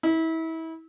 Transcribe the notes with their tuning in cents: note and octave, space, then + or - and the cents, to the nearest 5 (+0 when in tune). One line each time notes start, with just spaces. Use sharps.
E4 -30